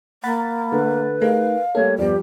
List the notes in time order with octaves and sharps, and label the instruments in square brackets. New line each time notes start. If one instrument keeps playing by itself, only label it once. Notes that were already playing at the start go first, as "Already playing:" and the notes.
[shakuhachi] A#3 [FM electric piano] F#5 B5 A6
[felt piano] D3 A3 [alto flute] B4
[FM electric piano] A3 D#4 G#4 [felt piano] A#4 [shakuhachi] F5
[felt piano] G3 A3 A#3 [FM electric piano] A4 [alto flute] C#5
[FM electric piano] E2 G2 B3 [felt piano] F3 G3 [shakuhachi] G4 [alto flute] D5